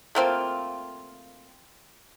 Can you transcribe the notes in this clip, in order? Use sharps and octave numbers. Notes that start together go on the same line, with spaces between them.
A3 A#3 C4 F4